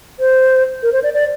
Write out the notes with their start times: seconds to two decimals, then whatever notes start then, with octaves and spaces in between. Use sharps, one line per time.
0.20 C5
0.83 A#4
0.93 C5
1.03 D5
1.14 D5